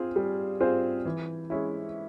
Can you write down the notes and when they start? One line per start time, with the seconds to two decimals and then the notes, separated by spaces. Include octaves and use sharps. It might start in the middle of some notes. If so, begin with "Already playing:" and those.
Already playing: C4 F4 G#4 C5
0.16 G3
0.60 C4 F4 G#4 C5
1.05 E3
1.50 G#3 C#4 E4